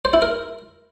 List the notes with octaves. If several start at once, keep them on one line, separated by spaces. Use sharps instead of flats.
C5
E4
A#4